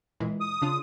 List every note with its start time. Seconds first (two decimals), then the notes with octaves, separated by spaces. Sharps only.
0.20 A#2 E3 G#3
0.41 D#6
0.62 C#3 D4 F4